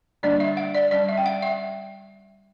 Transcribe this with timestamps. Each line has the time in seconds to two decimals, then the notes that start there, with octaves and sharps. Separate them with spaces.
0.23 D3 G3 A#3 D4 D5
0.40 E5
0.57 F#5
0.75 D5
0.91 G3 C#4 D5
1.08 E5
1.18 G5
1.26 F#5
1.42 E5